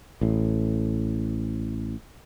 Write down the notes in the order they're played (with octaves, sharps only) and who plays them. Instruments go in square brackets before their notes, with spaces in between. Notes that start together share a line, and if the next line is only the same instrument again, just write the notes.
[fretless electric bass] A1 A2